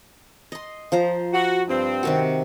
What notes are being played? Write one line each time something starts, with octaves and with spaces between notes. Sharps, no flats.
D#5 C6
F3 C5 A#5
F#4
G2 C4
C3 D#3 F#4